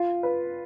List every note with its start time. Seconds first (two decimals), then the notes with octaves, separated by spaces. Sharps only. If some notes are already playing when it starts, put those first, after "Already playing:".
Already playing: F4
0.23 B4